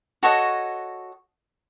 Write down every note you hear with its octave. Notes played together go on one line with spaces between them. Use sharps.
F#4 A4 C#5 D#5